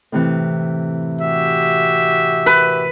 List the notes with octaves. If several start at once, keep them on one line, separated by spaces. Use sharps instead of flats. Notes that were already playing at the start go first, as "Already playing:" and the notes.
A2 C3 E3
F#4 G4 E5
B4